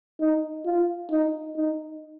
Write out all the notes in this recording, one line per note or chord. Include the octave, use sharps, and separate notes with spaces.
D#4
F4
D#4
D#4